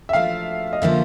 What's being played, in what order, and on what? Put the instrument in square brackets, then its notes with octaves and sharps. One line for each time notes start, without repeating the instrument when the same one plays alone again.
[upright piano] E5
[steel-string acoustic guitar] F3 A3 D4 F#4 [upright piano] F5
[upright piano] D#5
[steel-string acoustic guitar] D3 F3 A#3 C#4 F4 [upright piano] E5